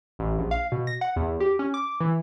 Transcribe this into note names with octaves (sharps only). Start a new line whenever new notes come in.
A1
A#1
F5
B2
A#6
F#5
E2
G4
C#4
D6
E3